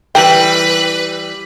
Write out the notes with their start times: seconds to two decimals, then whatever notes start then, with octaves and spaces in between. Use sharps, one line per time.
0.15 E3 G3 B4 G5